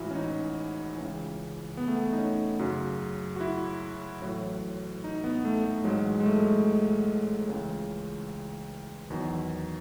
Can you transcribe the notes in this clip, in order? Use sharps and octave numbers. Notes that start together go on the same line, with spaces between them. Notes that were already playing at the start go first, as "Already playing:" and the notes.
Already playing: A1 G#2 E3 E4 F#4
C#4
D#4
C#2 C#3 E3
B3
A3
B3
D#4
C#4
F#2 C#3 F#3
F#4
E4
A1 A2 F#3
D#4
B3
A3
A3
A1 G#2 F#3 G#3
G#3
A3
C#2 C#3 E3
E2 D#3 F#3